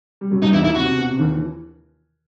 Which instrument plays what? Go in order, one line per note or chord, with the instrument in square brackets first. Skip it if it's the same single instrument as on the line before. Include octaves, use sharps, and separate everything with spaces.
[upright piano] G3
F#2 F#3
[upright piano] G2 G3 [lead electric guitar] D#4
[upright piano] E2 E3 [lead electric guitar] E4
[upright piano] D#2 D#3 [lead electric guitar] E4
[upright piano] C3 [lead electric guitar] F#4
[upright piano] C3
B2
C3
D#2 D#3
E3